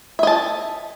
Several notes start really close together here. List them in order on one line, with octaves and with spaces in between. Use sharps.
E5 D#5 A5